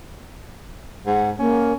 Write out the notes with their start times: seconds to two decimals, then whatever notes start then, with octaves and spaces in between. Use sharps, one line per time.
1.06 G#2 F#5
1.39 A#3 C#4